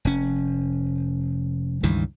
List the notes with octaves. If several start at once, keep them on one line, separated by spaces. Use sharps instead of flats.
F1 C#4
C#2 G2 D#3 E3